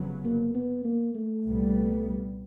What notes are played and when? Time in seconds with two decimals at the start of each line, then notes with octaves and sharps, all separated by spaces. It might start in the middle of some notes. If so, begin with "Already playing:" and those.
Already playing: F1 F2 C#3 F#3 B3
0.24 A#3
0.54 B3
0.85 A#3
1.15 A3
1.45 C2 A#2 G3 B3